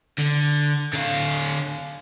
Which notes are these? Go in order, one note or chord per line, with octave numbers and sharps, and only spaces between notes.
D3
D3 F5